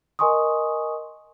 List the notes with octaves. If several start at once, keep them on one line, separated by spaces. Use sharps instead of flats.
A#4 D#5 G#5 C6 C#6 D#6